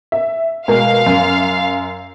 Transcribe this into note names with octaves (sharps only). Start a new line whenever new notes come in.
E5
B2 G#3 A#4 F5
F#2